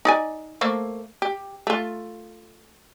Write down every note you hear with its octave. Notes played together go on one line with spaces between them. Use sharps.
D#4 D5 G#5
A3 A#3 C5
G4
A3 F4